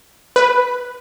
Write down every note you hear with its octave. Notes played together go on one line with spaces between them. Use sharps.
B4